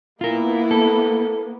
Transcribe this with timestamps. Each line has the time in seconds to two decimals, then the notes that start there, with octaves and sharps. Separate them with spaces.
0.21 A#3 B3 E4 F4 A#4
0.71 A4